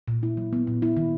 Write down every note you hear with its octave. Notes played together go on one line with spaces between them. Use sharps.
A#2
E4
F#3
B3
A#2
E4
D#3